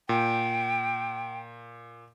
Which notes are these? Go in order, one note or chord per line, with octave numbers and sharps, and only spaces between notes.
A#2 G5